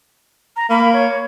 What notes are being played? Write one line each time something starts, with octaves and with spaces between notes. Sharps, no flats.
A#5
A#3 B5
C#5